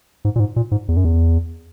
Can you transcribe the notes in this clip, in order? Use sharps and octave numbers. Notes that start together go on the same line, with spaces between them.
G#2
A#2
G#2
A#2
G#2
E2
F#2
E2